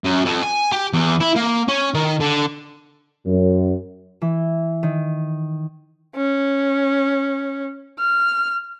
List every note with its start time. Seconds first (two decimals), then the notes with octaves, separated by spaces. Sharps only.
0.04 F#2
0.25 F2
0.43 G#5
0.72 G4
0.93 E2
1.21 E4
1.36 A#3
1.68 C#4
1.94 D#3
2.20 D3
3.26 F#2
4.22 E3
4.83 D#3
6.16 C#4
7.99 F6